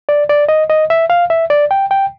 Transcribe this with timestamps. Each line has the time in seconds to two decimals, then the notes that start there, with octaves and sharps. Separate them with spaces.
0.09 D5
0.29 D5
0.49 D#5
0.70 D#5
0.90 E5
1.10 F5
1.30 E5
1.50 D5
1.71 G5
1.91 G5